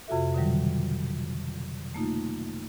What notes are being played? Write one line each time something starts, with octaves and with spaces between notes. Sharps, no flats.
F2 C3 F4 F#4 A4 E5
B2 D3 D#3 F#3 G3
A3 A#3 D#4 F4